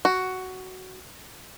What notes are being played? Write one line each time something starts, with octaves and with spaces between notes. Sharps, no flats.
F#4